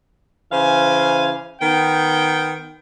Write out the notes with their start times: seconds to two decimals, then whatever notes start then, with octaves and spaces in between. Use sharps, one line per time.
0.52 C#3 E3 C5 F5 G#5
1.60 D#3 B3 G5